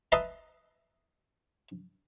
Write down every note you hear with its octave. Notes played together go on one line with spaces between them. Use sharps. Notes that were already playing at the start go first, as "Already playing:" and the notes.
B4 D#5 E5 A5 A#5 C6